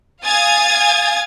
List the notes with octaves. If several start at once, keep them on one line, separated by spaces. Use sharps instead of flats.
F5 G#5 D#6 G#6 A6